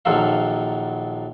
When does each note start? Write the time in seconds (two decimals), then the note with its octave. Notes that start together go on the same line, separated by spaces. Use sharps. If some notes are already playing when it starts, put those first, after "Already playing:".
0.05 A#1 D#3 F3 F#3 A4 F5